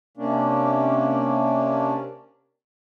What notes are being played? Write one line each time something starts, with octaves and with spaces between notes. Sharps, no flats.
C3 A#3 C#4 D4